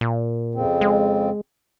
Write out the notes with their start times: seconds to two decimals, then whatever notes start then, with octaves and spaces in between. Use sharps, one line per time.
0.01 A#2
0.55 F2 C#3 C4
0.81 G#3